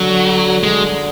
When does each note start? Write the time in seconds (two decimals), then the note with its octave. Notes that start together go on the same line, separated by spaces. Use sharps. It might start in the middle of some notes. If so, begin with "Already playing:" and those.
Already playing: D3 F#3
0.63 D3 G#3